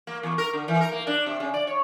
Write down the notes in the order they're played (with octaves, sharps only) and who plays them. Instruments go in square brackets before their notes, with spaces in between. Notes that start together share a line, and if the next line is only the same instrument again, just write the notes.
[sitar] A#3
E2
A#4
D3
E3
A#4
A#3
D4
C3
C#3
D5
C#5